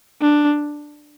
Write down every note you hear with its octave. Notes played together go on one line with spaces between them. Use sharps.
D4